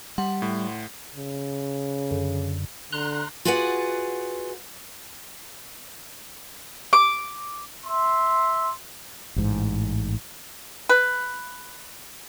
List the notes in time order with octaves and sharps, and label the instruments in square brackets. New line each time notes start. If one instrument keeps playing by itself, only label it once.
[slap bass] G3 [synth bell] F#5 C6
[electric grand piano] A2
[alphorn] C#3
[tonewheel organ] F#2 D3
[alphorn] D3 [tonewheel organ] A#5 C6 F#6
[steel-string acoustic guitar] F4 F#4 G#4 B4 D5 F#5
[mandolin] D6
[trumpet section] E5 C6
[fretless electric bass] A1 G#2
[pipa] B4